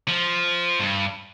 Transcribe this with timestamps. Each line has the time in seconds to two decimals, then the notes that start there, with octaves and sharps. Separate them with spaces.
0.08 F3
0.79 G2